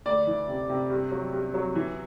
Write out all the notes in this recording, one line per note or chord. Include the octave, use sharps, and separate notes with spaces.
D2 D5
E3
C3
C3
G2
F#3
G2
F#3
E3